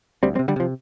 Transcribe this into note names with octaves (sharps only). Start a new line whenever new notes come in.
D2 G3 C4
G3 C4
C3
D3 G3
C3 F3